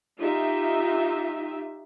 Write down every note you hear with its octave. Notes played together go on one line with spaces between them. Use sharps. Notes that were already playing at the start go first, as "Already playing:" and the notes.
D#4 F4 G4 E5